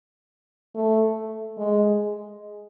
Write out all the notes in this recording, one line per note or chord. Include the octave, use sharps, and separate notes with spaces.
A3
G#3